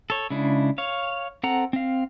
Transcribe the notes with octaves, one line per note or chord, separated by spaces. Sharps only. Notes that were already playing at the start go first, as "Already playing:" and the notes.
A4 C#5
C#3 G#3 D4 E4
C#5 F5
C4 A4 F#5 A#5
C4 F5